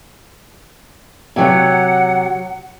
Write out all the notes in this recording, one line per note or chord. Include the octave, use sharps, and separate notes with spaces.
C3 F#3 F#5